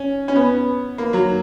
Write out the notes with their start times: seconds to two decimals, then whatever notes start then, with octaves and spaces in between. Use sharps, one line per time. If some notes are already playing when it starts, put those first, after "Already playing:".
Already playing: C#4
0.28 C#4
0.36 B3
0.98 A#3
1.13 F#3